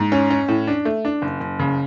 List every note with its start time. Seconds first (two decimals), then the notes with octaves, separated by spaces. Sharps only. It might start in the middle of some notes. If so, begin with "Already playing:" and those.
Already playing: G#2
0.12 C#4
0.31 C#4
0.48 A2
0.67 D4
0.85 A3
1.05 D4
1.22 F#1
1.40 F#1
1.59 C#3